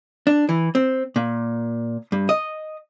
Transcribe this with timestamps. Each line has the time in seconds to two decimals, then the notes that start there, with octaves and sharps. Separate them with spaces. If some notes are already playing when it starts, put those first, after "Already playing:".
0.27 D4
0.49 E3
0.75 C4
1.16 A#2
2.12 G2
2.29 D#5